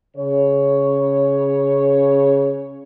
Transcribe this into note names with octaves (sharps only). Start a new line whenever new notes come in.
C#3 C#5